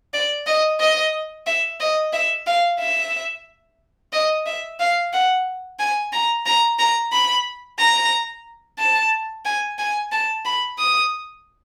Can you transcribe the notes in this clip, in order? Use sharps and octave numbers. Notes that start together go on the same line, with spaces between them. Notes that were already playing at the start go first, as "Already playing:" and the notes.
D5
D#5
D#5
E5
D#5
E5
F5
E5
D#5
E5
F5
F#5
G#5
A#5
A#5
A#5
B5
A#5
A5
G#5
G#5
A5
B5
D#6